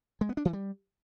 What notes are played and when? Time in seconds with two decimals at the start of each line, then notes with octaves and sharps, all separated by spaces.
0.21 G#3
0.29 B3
0.37 D4
0.45 E3
0.53 G3